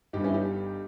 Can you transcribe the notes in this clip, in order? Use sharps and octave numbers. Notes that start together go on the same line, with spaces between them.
G1 G2 G3 D#4 G4
C#4 E4
D#4 G4